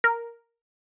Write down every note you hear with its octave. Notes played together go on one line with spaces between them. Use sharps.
A#4